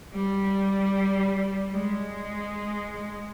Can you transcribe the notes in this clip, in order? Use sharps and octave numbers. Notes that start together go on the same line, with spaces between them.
G3
G#3